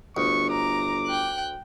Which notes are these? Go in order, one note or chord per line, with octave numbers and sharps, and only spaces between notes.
G1 D2 C#6
A#5 D6
G5 F#6